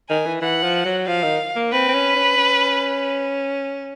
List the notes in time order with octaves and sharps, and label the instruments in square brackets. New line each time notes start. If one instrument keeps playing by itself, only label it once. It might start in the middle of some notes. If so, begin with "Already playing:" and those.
[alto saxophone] D#3 [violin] G#5
[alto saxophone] E3
[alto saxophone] E3 [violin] F#5
[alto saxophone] F3
F#3
[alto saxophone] F3 [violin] F5
[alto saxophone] D#3
A#3
[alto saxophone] C4 [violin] B4
[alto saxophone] C4
C#4
C#4
C#4